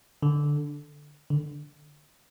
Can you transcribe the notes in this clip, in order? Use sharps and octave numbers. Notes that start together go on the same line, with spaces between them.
D3
D3